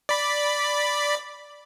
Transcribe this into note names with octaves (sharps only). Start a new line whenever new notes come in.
D5 B5